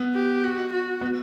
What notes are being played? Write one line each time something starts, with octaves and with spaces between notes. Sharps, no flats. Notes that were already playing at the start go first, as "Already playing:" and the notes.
Already playing: B3
G4
F#4
F#4
B3